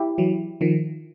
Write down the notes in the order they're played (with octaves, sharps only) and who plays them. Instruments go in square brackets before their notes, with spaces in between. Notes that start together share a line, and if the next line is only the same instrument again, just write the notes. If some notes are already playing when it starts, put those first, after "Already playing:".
Already playing: [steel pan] E4 G4
[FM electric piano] E3 F#3
D#3 F3